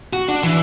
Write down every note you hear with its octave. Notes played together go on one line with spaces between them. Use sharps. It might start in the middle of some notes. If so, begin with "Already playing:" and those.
F#4
D4
E3